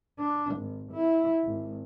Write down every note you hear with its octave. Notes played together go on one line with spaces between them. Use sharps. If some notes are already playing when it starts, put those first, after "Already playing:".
D4
G#1
E4
G#1